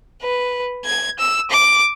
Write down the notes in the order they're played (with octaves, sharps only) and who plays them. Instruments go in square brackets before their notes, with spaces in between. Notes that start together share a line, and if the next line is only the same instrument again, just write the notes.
[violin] B4
G#6
E6
D6